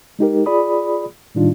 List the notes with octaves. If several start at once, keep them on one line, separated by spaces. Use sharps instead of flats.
G#3 D#4 G4 A#4
F4 G#4 D5 B5 D#6
A2 D#3 G3 D4 D#4 F4